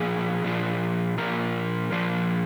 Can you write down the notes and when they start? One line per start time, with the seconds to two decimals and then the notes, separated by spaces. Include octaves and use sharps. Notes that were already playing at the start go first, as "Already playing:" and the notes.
Already playing: A#2 F3 G#4
0.44 A#2 F3
1.18 A#2 F3 A#4
1.92 A#2 F3